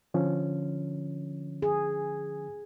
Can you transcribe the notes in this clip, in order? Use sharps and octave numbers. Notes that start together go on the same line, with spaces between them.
D3 F3 C#4
G#4